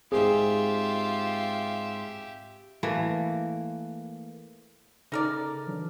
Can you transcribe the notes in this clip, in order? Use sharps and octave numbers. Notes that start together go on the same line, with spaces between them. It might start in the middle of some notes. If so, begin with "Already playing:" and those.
G#2 G#3 C4 F4 G4 G#4 E5
E3 A3 A#3
C#3 D#4 A4 A#4 D5 F6
E3 F#3 D4